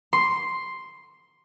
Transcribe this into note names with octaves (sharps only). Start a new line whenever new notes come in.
C6